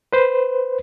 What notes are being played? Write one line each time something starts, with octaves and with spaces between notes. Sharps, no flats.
B4 C5